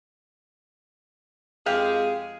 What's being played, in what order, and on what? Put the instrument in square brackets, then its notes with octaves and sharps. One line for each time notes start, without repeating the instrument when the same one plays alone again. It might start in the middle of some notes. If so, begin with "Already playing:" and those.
[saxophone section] F2 G#3 G#4 [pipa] G4 F5